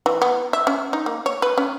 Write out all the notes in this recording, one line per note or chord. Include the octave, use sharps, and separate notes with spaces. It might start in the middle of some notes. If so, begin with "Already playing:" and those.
E3
B3
E5
C#4
D#4
A#3
C#5
B4
C#4